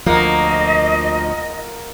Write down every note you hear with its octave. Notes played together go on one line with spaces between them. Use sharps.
D2 F3 A#3 F4 A#4 D#5 F#5